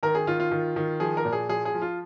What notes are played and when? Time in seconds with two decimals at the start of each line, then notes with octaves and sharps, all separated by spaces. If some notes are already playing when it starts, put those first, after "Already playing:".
0.03 D#3 A#4
0.15 G#4
0.27 D#3 F4
0.40 F4
0.51 D#3
0.76 D#3
1.00 F3 G#4
1.17 A#4
1.25 A#2
1.32 G#4
1.49 F3 G#4
1.65 G#4
1.74 F3
1.82 F4